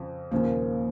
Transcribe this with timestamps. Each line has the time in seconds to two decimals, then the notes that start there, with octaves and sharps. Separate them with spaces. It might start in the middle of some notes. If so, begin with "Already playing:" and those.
Already playing: F2 C#3 F3
0.31 D#2 C#3 F3 A#3